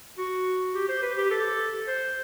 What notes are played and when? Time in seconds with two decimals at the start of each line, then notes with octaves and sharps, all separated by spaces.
0.18 F#4
0.74 G4
0.89 C5
1.02 B4
1.17 G4
1.31 A4
1.87 C5